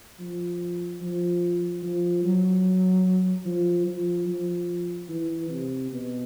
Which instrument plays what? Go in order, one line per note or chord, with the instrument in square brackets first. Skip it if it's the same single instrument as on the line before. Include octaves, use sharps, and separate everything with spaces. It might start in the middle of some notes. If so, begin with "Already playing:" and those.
[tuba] F3
F3
F3
F#3
F3
F3
F3
E3
C3
B2